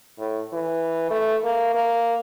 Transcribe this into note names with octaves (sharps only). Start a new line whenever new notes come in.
A2
E3
A3
A#3
A#3